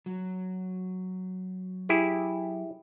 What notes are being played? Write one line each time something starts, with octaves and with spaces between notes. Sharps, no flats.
F#3
E4 G4 G#4